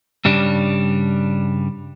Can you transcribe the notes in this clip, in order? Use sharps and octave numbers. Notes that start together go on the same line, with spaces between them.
G2 C#3 G3 D4